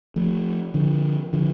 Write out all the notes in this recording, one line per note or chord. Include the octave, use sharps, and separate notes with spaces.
F3 A3
D3 F3
D3 F3